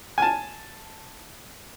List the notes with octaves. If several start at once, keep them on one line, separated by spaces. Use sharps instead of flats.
G#5 A5